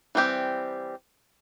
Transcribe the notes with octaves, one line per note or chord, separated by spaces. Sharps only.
E3 G3 C4 G4